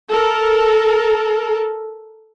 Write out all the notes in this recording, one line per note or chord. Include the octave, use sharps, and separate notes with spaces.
A4 A#4